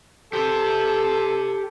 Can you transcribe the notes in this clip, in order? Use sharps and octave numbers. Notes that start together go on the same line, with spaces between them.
G4 A4 C5